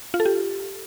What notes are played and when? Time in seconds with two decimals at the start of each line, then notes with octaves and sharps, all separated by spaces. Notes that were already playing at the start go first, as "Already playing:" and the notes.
0.14 F4
0.20 A4
0.26 G4